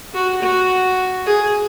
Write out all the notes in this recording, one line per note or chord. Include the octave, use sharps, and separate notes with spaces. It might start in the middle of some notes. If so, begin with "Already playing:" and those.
F#4
F#4
G#4